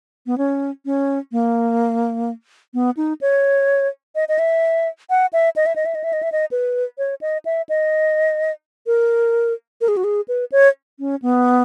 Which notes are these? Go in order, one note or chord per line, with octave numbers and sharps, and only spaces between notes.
B3
C#4
C#4
A#3
B3
D#4
C#5
D#5
D#5
E5
F#5
E5
D#5
E5
D#5
E5
D#5
E5
D#5
E5
D#5
B4
C#5
D#5
E5
D#5
A#4
A#4
G#4
F#4
G#4
B4
C#5
C#4
B3